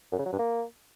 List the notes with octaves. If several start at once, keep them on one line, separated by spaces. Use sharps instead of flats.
F#2
C#3
F#3
G2
A#3